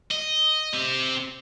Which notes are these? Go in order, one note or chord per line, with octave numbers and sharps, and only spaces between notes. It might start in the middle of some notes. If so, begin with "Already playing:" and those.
D#5
C4 G4